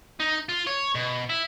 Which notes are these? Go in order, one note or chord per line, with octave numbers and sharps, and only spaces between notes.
D#4
F4
C#5
B2
E4